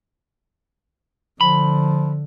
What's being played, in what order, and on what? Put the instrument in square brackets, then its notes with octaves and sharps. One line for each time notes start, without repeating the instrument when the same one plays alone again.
[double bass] D3 [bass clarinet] F3 [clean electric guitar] B5